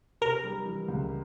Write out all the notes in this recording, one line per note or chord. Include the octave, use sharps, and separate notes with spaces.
C3 A#4
G3
E3
C#2